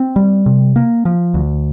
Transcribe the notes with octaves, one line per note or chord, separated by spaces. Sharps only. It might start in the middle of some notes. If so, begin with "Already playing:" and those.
Already playing: C4
G3
C3
A#3
F3
D2